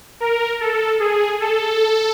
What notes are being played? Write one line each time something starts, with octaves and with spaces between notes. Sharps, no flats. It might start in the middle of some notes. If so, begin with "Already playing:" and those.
A#4
A4
G#4
A4